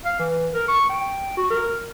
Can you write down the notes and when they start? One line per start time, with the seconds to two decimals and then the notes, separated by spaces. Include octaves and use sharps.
0.05 F5
0.19 E3
0.53 A#4
0.68 C#6
0.89 G5
1.37 F#4
1.50 A#4